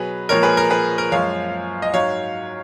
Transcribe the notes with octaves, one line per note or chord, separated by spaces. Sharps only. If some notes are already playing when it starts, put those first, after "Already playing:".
Already playing: B2 F#3 G#4 B4
A#2 F3 G#3 A#4 C#5
G#4 B4
A#4
G#4 B4
A#4
F#2 F3 G#3 C#5 F5
D#5
G#2 F#3 C#5 F5